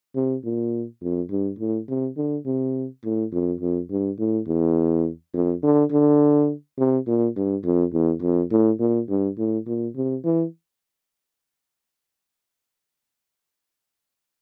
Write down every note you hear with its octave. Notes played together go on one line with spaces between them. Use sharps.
C3
A#2
F2
G2
A2
C3
D3
C3
A2
F2
F2
G2
A2
E2
F2
D3
D3
C3
A#2
G2
F2
E2
F2
A2
A#2
G2
A2
A#2
C3
E3